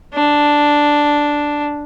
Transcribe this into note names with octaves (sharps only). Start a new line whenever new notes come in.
D4